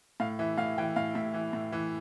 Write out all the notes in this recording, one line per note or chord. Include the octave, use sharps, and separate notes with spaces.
A2 F5
E3 E5
A2 F5
E3 G5
A2 F5
A2 E5
E3
A2
E3